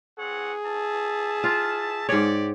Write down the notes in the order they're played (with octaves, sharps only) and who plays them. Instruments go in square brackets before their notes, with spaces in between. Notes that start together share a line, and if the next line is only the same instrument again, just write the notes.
[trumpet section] C4 C#5 F#5 [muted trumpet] G#4
[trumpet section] E5 A5
[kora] F4
[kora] G#2 C#5 [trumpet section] G4 D5